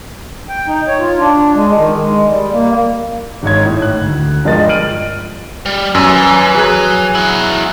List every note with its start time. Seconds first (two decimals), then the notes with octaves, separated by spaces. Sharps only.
0.49 G5
0.67 D#4
0.87 C#5
0.99 F4
1.19 D4
1.54 G#3
1.77 D#3
1.98 G#3
2.26 G3
2.53 A#3
3.43 G#1 G#2 C#5 G#6
3.66 A2
3.82 F#6
4.02 D2
4.45 G2 F3 G#3 A#4 D#5 A6
4.69 F6 D7 D#7 F#7
5.66 G3
5.95 F#2 B4 G#5 E6
6.55 F#3 G#4 F#6
7.15 E4 F#4